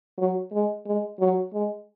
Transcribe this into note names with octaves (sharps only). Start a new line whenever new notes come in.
F#3
G#3
G#3
F#3
G#3